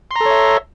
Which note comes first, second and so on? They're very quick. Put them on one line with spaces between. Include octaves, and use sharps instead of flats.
C6 A#5 A4 C#5 E5